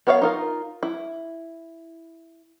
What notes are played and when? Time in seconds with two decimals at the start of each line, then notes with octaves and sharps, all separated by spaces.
0.07 B3 A#4 C#5 D5 F5
0.22 D#4 F4 A#4
0.83 E4